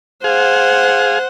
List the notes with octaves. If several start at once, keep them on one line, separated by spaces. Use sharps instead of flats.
G#4 C5 F5 F#5